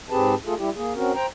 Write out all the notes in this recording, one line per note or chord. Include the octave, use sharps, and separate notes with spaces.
G#2 C4 G4 G#4 B4 A5
A3 F4 G#4 A4
G3 E4 G4
A#3 G#4
C4 C#4 F#4 A#4
C5 G5 A#5